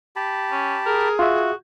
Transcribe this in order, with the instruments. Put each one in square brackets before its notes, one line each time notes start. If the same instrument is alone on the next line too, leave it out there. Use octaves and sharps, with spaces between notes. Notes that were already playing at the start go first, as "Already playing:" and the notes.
[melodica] G4 A5 B5
[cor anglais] C#4
[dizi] G#4 [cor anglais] A#4
[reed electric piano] F4 E5 [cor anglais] F#4